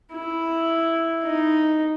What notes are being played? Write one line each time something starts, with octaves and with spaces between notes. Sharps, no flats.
E4
D#4